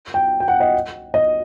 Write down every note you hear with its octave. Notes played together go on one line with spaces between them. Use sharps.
G5
G5
F#5
D#5
D#5